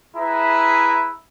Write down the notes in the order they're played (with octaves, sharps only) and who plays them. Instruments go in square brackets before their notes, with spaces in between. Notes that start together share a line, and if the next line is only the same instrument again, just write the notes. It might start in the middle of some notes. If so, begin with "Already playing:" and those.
[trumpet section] E4 G#4 B4 E5 A#5